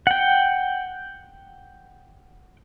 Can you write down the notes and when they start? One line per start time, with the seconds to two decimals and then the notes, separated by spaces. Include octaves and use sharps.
0.07 F#5 G5